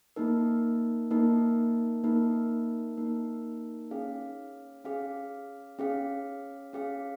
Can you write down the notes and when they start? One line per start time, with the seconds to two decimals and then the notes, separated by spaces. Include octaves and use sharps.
0.16 A#3 D#4 A#4
1.11 A#3 D#4 A#4
2.04 A#3 D#4 A#4
2.97 A#3 D#4 A#4
3.91 C#4 G#4 F5
4.85 C#4 G#4 F5
5.79 C#4 G#4 F5
6.73 C#4 G#4 F5